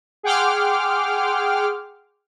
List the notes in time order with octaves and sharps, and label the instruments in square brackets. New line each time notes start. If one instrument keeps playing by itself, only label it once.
[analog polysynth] G#4 F#5 G5 C6 D6 F6